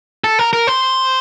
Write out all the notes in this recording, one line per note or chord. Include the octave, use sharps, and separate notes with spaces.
A4
A#4
A#4
C5